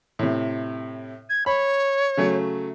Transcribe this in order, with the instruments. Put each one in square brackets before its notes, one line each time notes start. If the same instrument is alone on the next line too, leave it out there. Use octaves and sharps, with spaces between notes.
[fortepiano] A2 C3
[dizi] G#6
[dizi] C#5 [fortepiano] B5
[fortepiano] C#3 F#3 A3